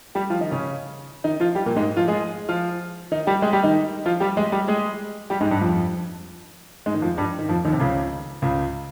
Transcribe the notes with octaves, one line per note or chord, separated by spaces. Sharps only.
G3 G4
F3 F4
D#3 D#4
C#3 C#4
D#3 D#4
F3 F4
G3 G4
A#2 A#3
G#2 G#3
F3 F4
G#3 G#4
F3 F4
D#3 D#4
G3 G4
G#3 G#4
G3 G4
D#3 D#4
F3 F4
G3 G4
G#3 G#4
G3 G4
G#3 G#4
G3 G4
G#2 G#3
G2 G3
F2 F3
G#2 G#3
D#3
F2 F3
G2 G3
D#3
F2 F3
D#2 D#3
C3
C#2 C#3
C#2 C#3